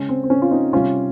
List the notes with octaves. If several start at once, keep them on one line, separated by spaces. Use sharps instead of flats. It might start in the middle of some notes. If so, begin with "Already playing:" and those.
Already playing: C#3 G#3 C#4
C4
C4
C#4
F4
C4 D#4
C3 G3 C#4 F4